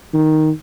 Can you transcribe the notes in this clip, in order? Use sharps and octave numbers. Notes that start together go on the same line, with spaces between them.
D#3